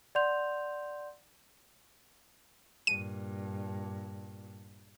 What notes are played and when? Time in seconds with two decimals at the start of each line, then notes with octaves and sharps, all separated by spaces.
0.15 D5 F#5 C6 G6 F7
2.87 G2 A#2 D#7